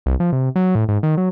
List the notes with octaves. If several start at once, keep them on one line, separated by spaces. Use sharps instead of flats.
C2
F3
C3
F#3
A2
G#2
D#3
F#3